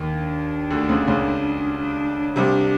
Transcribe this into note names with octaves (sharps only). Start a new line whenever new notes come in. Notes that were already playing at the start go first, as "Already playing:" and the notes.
Already playing: D#2 D#3
D4
D2 D3
C#2 C#3
C#2 C#3
D4
C2 C3 D4